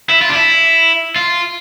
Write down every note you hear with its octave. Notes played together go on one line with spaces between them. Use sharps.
E4
F4
D4
E4
F4